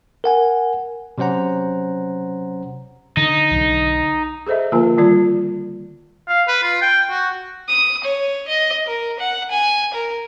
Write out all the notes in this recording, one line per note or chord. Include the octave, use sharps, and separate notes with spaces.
A#4 F#5 G#5
C3 F#3 C#4 C5 F#5 A#5
D3 D#4
B1 D3
G#4 A4 C5 D#5 E5
D3 F3 A#3 F4 A#4 G#5
D#3 G3 F4 D5
F5
B4
F4
G5
F#4
D#6
C#5
D#5
A#4
F#5
G#5
A#4